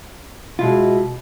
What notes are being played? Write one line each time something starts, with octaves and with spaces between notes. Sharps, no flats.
B2 G#3 E4 F4